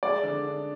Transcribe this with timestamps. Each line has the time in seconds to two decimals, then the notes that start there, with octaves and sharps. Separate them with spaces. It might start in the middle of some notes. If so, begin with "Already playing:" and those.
0.03 G#3 D5
0.23 D3
0.44 D4